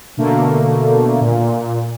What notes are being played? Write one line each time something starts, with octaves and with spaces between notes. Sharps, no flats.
B2 D3 A3 A#3
A#2